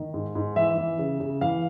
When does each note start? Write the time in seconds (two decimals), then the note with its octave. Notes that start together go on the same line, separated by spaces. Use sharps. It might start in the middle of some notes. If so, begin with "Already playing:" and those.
Already playing: D#3
0.14 G#2
0.35 G#2
0.56 E3 E5
0.78 E3
0.99 C#3
1.20 C#3
1.41 E3 F5